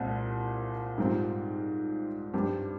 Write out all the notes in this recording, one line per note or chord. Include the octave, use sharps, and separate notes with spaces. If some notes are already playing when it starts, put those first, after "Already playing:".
Already playing: C2 A#2 G#3 C4
G#2 G3 C4 F4
G2 G3 C4 G4